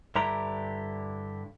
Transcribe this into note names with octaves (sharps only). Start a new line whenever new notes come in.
G2 D3 E4 G4 A#5